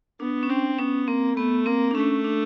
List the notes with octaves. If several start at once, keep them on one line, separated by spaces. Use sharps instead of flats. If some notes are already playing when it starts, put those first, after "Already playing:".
B3 D4
C#4
C4 D4
B3 C#4
A#3 C4
A3 B3
A#3 C4
D4
A3 C#4
D4